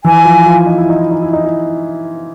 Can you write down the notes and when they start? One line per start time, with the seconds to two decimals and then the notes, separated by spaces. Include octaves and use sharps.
0.04 E3 E4 G#5
0.25 F3 F4
0.46 F3 F4
0.66 D#4
0.78 E4
0.89 D#4
1.00 E4
1.11 D#4
1.22 E4
1.33 D#4
1.45 E4